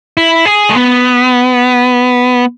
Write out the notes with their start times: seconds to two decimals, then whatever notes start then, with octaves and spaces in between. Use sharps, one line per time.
0.17 E4
0.45 G#4
0.70 A3
0.75 B3